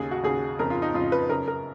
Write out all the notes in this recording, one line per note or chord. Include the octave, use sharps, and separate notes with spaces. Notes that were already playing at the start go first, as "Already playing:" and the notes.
Already playing: D#2 C#3 G#4
F#4
D#2 C#3 G#4
F2 C#3 A#4
F4
D#4
F2 C#3 F4
B4
F#2 C#3 A#4
A#4